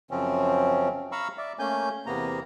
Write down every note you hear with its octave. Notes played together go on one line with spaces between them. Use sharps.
F#2 C#3 F3 C4 C#4
F5 A#5 B5 C#6 E6
D5 E5
A3 A#3 C#4 G#5 G6
E2 C3 A#3 B3 A#5